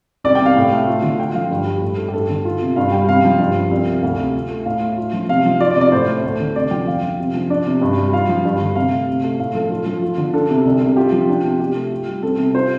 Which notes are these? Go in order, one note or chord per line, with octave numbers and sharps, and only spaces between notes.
C2 D5
G5
C3
F5
A2
A3
F4
D3
F4 G5
F3 F5
G2
G3
A2
A3
G4
G2 A4
D3
F4
C3
G2 F5
G3 G5
C3 F5
F3
G2
F3
C2
C3
D2 F5
C3
F4
A3
A2 F5
A3
F4
F3
C3 F5
F3
F4 D5
D5
C3
D5
A2 C5
A3
D2
D3
C3 D5
F3 G5
F2 F5
F3
C3
F3
D4 D5
C3
G2
G3
F4 F5
F3
G2
D3
C3 F5
A3
C3
A3
A2 F5
F3 A4
F4 A4
F3
F4
D3
D4 A4
C3
C2
C3
F4 G4
F3
D4
C3
C3 G4
A3
F4
G3
C4 A4
C3
F4 C5